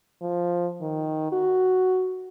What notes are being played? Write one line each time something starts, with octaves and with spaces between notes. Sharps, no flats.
F3
D#3
F#4